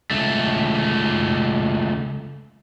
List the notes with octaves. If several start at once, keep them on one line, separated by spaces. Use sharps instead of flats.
C#2 A3